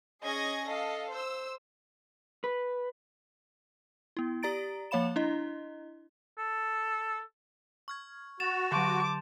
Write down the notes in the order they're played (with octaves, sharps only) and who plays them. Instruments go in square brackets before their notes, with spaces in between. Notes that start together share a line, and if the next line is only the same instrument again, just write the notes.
[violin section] C#4 G#4 D#5 G#6 A#6
A4 D#5 F5
C5 E6
[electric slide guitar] B4
[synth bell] B3 E4
G4 D5 A#5 A6 D7
F3 A#3 C#5 F5 B5 E7
D4 E4 D#5
[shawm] A4
[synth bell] C#6 F6 G#6
[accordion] F#4 [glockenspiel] A6 E7 F7
[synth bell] D3 F#3 [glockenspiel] A5 C6 G6 [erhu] D6